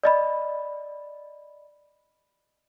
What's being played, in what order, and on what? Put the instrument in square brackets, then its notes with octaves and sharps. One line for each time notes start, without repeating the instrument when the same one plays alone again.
[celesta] D5 D#5 B5